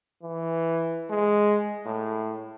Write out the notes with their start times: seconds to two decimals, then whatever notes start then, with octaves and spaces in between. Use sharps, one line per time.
0.23 E3
1.10 G#3
1.86 A2